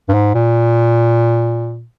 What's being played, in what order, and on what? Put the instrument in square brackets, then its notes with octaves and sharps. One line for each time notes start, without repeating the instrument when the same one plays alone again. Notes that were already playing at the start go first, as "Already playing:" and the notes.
[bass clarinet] G2
G#2
A#2